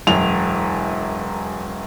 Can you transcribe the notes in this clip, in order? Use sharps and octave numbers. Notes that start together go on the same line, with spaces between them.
E1 F#2 F7